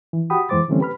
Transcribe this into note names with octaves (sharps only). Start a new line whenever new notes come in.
E3
F#4 G4 F#5 G5 B5 D#6
F2 E3 G#3 C5 D6 A6
D3 E3 G3 A3 C4 C#4
G4 B4 B5 F6